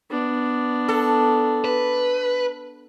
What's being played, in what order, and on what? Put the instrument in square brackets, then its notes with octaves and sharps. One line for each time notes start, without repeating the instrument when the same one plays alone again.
[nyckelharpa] B3 D4
[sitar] A4
[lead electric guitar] B4